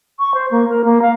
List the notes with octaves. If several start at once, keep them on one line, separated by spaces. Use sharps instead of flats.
C#6
C5
A#3
A#4
A#3
F5